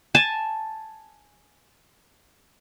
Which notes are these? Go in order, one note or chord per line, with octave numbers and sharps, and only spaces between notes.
G#5 A5